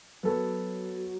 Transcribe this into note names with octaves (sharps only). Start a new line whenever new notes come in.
F#3 B3 A4